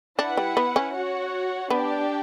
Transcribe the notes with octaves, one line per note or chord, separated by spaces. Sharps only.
D4 E4 B4 F#5
G3
B3
C#4
F#4 C#5 F#5
B3 D4 G4 D5 G5